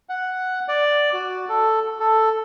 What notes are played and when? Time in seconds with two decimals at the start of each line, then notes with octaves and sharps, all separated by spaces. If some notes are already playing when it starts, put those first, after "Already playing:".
0.09 F#5
0.68 D5
1.13 F#4
1.49 A4
2.00 A4